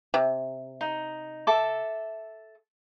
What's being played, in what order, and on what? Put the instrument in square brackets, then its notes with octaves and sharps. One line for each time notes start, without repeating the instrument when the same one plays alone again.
[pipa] C3
[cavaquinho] D#4
A4 E5 D6